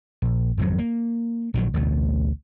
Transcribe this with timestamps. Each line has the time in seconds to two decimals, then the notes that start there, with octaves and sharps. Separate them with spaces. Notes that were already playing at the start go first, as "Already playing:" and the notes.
0.22 A#1
0.58 G#1 F2 C3 F#3
0.78 A#3
1.54 A#1 D#3 F3 F#3
1.74 A1 D2 B2 A3